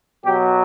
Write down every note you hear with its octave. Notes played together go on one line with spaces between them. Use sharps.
B2 F#3 G4